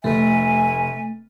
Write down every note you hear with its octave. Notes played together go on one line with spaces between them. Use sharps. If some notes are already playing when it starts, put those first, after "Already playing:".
F1 A3 E5 G#5